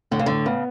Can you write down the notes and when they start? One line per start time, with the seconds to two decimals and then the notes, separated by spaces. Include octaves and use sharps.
0.11 A2 D3
0.19 C#3
0.26 A2 D3
0.46 C#3 B3